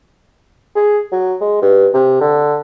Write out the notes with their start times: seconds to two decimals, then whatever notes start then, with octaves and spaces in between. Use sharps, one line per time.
0.76 G#4
1.12 F#3
1.41 G#3
1.62 G2
1.94 C3
2.21 D3